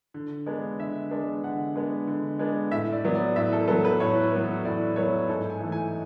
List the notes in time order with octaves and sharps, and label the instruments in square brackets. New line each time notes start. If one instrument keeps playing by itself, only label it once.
[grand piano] D3
G#3 B3 D4
D3 E5
G#3 B3 D4
D3 F#5
G#3 B3 D4
D3
G#3 B3 D4
A2 E5
D5
F#3 B3
D5
A2 E5
A4
F#3 B3 A4
B4
A2 C#5
F#3 B3
A2 D5
F#3 B3 C#5
G#2 A4
G#5
E3 A3
G#5